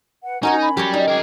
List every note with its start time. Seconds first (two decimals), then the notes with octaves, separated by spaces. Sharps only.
0.24 B4 F#5
0.43 C#4 D#4 F#4 A#4 C#5 F#5 A#5
0.62 B5
0.77 F#3 G3 G4 A#4 C#5
0.94 D#4 D5
1.08 G#4 A#4 G5 D6